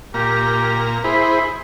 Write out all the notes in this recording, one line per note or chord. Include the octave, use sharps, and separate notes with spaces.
A#2 G4 A#5
E4 G#4 C5 B5